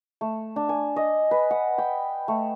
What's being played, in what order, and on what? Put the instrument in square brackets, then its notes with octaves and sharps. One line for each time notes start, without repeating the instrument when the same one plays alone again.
[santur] A3
D4
G#5
D#5
B4
F#5
G5
A3